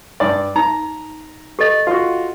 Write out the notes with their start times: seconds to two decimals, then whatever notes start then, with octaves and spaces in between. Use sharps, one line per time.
0.20 G2 D5
0.56 D#4 A#5
1.59 G4 A4 D#5
1.87 F4 F#4